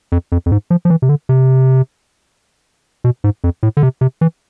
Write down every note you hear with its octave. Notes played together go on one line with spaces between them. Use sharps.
F2
F2
F2
G#2
F3
F3
E3
C3
D3
C3
B2
G#2
F2
A2
D3
C3
C3
E3